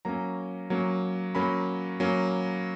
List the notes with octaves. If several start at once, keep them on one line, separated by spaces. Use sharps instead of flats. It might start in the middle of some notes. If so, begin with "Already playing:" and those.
F#3 A#3 C#4 A#5
F#3 A#3 C#4
F#3 A#3 C#4 B5
F#3 A#3 C#4